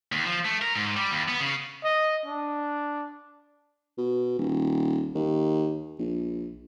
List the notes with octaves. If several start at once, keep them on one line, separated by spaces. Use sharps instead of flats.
D#2
F3
A3
A#4
G#2
G3
D#2
B3
C#3
D#5
D4
B2
D#1
D#2
A#1